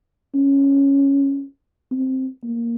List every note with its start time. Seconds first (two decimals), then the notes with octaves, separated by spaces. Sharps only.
0.35 C#4
1.91 C4
2.44 A#3